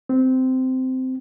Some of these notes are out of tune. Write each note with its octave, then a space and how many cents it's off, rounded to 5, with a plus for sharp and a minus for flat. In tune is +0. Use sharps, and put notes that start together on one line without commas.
C4 -15